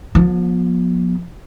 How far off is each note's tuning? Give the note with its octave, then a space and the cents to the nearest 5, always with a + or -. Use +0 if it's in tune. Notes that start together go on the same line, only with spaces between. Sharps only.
F3 +35 B3 -35